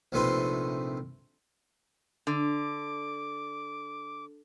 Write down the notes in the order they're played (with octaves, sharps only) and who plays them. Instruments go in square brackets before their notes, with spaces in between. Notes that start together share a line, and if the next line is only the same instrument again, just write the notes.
[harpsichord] A#1 C3 A3 D#4 B4 C6
[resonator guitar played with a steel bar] D3 [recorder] D6